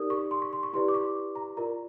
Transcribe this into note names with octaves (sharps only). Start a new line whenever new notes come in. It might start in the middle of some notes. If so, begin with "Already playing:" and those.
Already playing: D#4 G4 A#4 D5 D#6
C#6
C6
C#6
C6
C#6
E4 G4 B4 D5 C6
D6
C#6
A#5
F4 A#4 D5 A#5